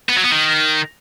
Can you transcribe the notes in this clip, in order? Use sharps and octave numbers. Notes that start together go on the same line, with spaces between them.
B3
F#3
B3
D#3